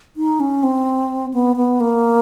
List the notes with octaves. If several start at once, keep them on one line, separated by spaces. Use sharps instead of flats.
D#4
C#4
C4
B3
B3
A#3